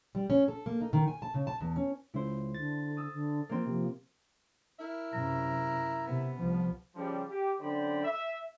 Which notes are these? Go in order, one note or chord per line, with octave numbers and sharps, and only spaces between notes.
G3
C#4
A4
A#3
D#4
D#3
G#5
A5
C#3
A5
E2
C#4
C#2 E4 C5
D3 A6
D#6 E6
D3
F3 A#3 C4
C3 F3
E4 A#4 E5
F#2 C3 A#5
C3 B3
C2 F3
C#3 F3 G3
G4
F#2 D3 C5 D5 G5 B5
E5